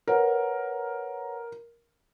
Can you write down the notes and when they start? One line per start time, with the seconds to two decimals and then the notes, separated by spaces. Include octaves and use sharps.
0.08 A#4 B4 C#5 F#5